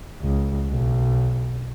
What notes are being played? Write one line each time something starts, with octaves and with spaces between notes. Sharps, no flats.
C#2
B1